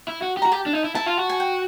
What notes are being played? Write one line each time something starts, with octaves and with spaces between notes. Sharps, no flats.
E4
F#4
G4
F#4 A#5
G4 A5
D4
D#4
E4
E4 A5
F4
F#4
G#5
G5